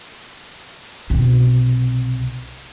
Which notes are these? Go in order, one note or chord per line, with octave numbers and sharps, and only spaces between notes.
B1 C3